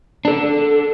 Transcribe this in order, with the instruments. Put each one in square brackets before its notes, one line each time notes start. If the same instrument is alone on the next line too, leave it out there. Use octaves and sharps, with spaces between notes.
[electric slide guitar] D4 A4